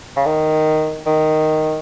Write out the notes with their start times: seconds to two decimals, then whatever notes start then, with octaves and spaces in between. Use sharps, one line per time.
0.17 C#3
0.26 D#3
1.06 D#3